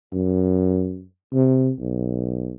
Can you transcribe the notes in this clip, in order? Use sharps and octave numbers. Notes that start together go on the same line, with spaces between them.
F#2
C3
B1